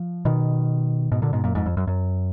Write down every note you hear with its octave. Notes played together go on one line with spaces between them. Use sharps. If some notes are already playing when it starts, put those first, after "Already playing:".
Already playing: F3
B2 D#3
G#2 B2
A#2 D3
G#2 B2
F#2 A#2
F2 G#2
F2
F#2
F#2